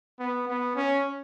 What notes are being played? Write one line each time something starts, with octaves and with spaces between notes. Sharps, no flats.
B3
B3
C#4